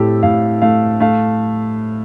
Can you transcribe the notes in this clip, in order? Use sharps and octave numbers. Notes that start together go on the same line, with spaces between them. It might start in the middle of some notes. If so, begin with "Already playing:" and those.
Already playing: A2 C4 G4 A4
A2 F5
A3 F5
A3 F5